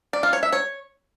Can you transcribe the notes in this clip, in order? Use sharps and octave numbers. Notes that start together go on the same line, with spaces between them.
D5
F4
C#5
E5
C#5